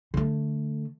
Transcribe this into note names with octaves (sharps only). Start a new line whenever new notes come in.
D3 A3